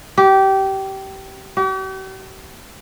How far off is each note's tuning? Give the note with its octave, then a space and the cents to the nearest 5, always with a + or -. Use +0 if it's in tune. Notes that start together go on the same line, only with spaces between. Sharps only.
G4 -20
G4 -45